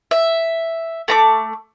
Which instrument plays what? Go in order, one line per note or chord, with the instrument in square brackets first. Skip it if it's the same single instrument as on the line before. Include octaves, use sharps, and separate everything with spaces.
[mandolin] E5
A3 A#5 D6